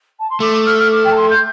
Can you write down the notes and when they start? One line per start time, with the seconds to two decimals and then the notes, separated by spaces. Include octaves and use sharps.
0.19 A5
0.29 C6
0.40 A3 D6
0.53 D6
0.66 F6
0.78 F6
0.91 D6
1.04 G5
1.11 A5
1.16 C6
1.30 G6